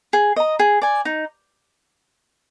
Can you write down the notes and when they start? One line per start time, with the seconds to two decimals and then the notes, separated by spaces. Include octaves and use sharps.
0.13 G#4
0.36 D#5 A#5
0.59 G#4
0.82 D5 G#5
1.05 D#4